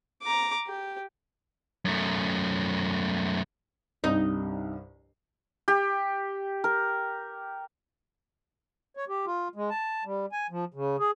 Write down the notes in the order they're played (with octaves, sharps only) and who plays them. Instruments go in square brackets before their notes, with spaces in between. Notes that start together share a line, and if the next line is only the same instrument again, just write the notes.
[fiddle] A#5 D6
G4
[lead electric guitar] F#2 A3
[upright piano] C2 G2 [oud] D#4
[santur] G4
A#4
[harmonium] C#5
G4
F4
G#3
A5
G3
G#5
F3
C#3
G#4